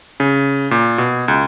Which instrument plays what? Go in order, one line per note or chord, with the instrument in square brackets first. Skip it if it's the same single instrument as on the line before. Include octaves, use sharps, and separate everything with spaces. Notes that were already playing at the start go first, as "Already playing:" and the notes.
[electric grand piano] C#3
A#2
B2
C#2